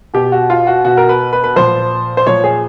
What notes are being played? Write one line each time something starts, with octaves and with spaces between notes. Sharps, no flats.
B2 G4
F#4
F4
F#4
B2 F#4
A#4
B4
B4
B4
A#2 F3 C5
C5
A#2 F3 C#5
G#4